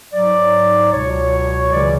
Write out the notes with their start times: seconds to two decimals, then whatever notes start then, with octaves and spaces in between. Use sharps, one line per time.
0.13 G#2 F#3 D5
0.92 C#2 B2 F#3 C#5
1.72 C#2 C#3 E3 D5